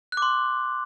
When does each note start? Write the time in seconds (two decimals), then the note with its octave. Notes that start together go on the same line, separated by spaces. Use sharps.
0.12 F#6
0.17 D6
0.22 C6